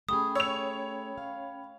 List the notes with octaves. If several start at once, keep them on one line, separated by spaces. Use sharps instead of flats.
A3 C#4 G4 G#4 G5 B5 D#6
C#5 E6 F7
F5